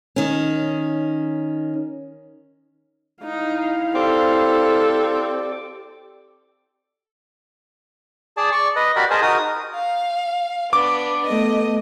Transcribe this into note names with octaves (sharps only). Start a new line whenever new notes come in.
D#3 C#4
D#4 E4 F5
C4 G4 A4 D5 D6
G#4 D5 A5
D5 C#6
B4 D#5
F#4 G4 A#4 D5 B5
G#4 A#4 C5 D#5 G#5 A5
D#4 F#4 A#4 D#6
F5
B3 D4 D6
A3 B3 D#5